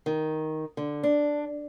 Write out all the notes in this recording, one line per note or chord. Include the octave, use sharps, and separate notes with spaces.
D#3
D3
D4